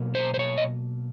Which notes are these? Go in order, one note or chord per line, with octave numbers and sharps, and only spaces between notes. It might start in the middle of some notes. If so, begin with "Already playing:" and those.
Already playing: B2 F#3 A#3
C5
C5
C#5
D#5